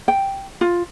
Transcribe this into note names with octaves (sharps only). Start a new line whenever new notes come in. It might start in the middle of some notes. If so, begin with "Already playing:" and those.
G5
F4